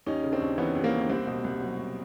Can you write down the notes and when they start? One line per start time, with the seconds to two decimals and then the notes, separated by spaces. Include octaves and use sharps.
0.06 D#2 C#4 D#4
0.24 C#3
0.32 C4 D4
0.41 D#2
0.58 E3 B3 C#4
0.75 D#2
0.84 A#3 C4
0.93 C#3
1.01 C#4
1.09 C2 A#3 C4
1.27 B2
1.44 C2
1.61 F#3
1.79 C2